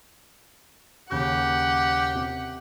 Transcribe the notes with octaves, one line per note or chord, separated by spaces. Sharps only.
D#2 C#3 G4 F#5 G6
C3